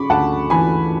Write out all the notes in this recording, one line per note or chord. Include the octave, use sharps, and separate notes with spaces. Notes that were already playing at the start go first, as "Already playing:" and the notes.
Already playing: C#3 B5 C#6 D6
D2 F#5 A5
E3 G#5 B5